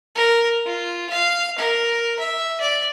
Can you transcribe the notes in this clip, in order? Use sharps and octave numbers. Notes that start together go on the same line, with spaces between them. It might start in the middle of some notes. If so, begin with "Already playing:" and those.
A#4
F4
F5
A#4
E5
D5